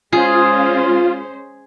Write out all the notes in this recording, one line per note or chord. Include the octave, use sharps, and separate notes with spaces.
G#3 C#4 F4 G#4 C5